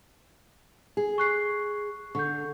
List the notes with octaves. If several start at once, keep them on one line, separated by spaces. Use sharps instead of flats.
G#4
C#6 F#6 C7
D3 C#6 G6